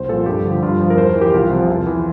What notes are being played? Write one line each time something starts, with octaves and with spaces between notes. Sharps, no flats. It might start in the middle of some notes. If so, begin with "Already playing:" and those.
Already playing: C2 C5
A#2 F3 A4
G2 G4
D3 F3
G2 F4
F3
A#4
E2 C5
A#4
E3
G4
C2 F4
C3 F3
E2
E3